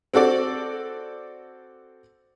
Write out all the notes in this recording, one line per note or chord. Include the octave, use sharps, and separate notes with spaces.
C4 F#4 A4 D5